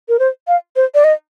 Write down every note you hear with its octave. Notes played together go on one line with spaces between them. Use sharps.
A#4
C5
F5
C5
D5
D#5